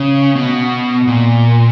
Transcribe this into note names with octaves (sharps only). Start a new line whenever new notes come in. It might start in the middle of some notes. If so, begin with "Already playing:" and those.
Already playing: C#3
B2
A#2